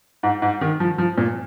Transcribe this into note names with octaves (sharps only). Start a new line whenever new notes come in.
G#2
G#2
D#3
F3
F3
A#2